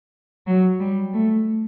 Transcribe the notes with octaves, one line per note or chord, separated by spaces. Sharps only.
F#3
G3
A3